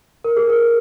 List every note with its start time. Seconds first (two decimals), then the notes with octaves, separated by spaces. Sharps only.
0.24 A#4
0.37 G#4
0.50 A#4